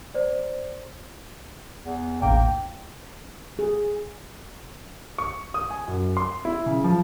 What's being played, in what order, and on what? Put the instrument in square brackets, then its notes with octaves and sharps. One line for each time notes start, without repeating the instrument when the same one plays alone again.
[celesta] C5 D5
[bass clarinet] E2
[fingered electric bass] E1 A1 D4 [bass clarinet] A#3 [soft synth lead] G5
[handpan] G#4
[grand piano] C#6
D#6
G#5
F#2
C6
E4
C#3
F3